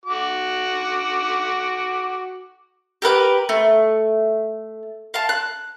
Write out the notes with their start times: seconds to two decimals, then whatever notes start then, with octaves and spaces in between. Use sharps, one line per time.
0.05 F#4 D6
3.02 G4 A#4 B4 D6
3.49 A3
5.14 F5 A5
5.29 F#6